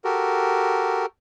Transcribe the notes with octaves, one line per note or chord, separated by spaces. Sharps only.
F#4 G4 A4 A#4